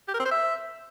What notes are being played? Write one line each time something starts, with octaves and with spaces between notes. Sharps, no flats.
G4
A#4
C4
C5
E5